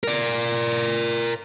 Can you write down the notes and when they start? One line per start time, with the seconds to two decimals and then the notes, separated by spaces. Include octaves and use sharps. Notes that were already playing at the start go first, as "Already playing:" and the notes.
0.04 A#4 D5